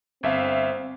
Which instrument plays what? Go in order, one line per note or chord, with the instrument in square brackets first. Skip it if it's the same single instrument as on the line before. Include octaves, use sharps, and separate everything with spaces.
[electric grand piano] G1 E5 F5 [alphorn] C4